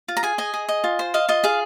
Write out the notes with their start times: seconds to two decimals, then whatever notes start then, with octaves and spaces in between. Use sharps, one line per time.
0.08 F4
0.17 A#5
0.23 G#4 G#5
0.38 D#5 G#5
0.54 G#4
0.69 D#5
0.84 F4
0.99 C5
1.14 D#5 F5
1.29 F4 D#5
1.44 G#4 F5